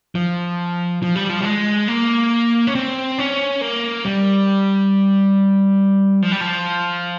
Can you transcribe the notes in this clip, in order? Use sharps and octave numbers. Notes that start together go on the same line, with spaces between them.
F3
F3
G3
F3
G3
G#3
A#3
C#4
C4
C#4
A#3
G3
F3
G3
F3